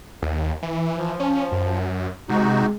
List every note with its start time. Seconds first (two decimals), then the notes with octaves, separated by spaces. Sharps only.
0.22 D#2
0.63 E3
0.97 F3
1.20 C#4
1.52 F#2
2.29 C3 G#3 D#4 F#4